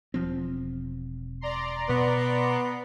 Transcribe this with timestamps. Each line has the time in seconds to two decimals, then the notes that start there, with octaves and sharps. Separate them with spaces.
0.14 E1 F3 C4
1.41 D5 A#5 C6
1.89 B2 B3